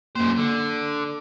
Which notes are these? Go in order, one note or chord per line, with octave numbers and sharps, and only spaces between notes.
F#2 A#3 C5
D3